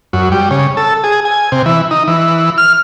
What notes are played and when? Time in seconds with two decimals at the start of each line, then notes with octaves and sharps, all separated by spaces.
0.13 F#2
0.32 G3
0.51 C#3
0.77 A4
1.04 G#4
1.25 G#5
1.52 C3
1.66 E3
1.91 D#4
2.08 E3
2.58 F6